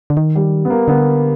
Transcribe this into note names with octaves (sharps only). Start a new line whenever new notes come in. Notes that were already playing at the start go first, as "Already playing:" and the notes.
D3
D#3
G3
B3
A#3
D3 B3